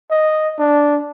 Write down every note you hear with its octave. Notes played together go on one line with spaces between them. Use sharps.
D#5
D4